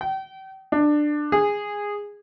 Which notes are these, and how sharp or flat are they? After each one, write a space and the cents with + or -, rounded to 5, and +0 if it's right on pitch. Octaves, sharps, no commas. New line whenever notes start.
G5 -35
D4 +15
G#4 -15